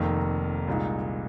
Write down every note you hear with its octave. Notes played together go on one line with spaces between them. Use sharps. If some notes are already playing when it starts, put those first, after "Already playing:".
Already playing: F1 F2 D#3 A#3
C2 A#2 G#3 D#4